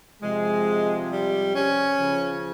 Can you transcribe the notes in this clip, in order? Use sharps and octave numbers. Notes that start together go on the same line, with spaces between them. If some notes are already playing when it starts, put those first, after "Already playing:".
C3 F3 G#3
G3
C#4
C#3 F3